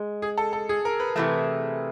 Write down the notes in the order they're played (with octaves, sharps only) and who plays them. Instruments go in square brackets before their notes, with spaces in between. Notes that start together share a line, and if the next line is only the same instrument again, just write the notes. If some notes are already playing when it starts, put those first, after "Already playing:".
Already playing: [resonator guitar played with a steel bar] G#3
[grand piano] G#4
A4
A4
G#4
A#4
B4
[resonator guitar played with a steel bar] C3 E3 A3